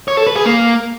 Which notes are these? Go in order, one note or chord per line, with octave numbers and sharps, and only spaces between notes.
C#5
A4
B4
G#4
A#3